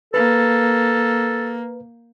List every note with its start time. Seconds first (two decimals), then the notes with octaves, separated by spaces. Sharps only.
0.14 A#3 A4 B4